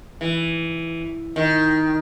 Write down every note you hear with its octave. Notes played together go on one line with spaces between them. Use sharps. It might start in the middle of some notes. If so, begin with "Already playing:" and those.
E3
D#3